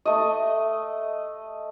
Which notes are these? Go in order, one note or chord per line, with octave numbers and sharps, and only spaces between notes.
A3 D#5